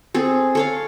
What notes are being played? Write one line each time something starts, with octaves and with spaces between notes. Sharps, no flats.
C4 G#4 A4
A4 C#5 F5